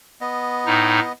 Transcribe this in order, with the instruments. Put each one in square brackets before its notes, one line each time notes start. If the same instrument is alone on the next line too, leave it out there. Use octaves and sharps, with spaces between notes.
[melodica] B3 D#5
[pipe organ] A2 D#4